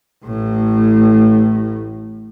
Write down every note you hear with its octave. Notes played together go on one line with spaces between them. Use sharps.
A1 A2